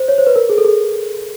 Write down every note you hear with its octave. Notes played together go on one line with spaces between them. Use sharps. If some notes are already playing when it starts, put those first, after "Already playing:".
Already playing: C5
C#5
C5
B4
A#4
G#4
A4
G#4